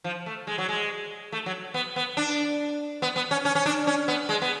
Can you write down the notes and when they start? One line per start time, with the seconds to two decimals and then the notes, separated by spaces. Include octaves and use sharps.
0.04 F3
0.26 A3
0.47 G#3
0.58 F#3
0.69 G#3
1.32 A3
1.46 F#3
1.74 B3
1.96 B3
2.17 D4
3.02 B3
3.16 B3
3.31 C#4
3.45 C#4
3.55 C#4
3.66 D4
3.87 C#4
4.08 B3
4.29 G#3
4.42 B3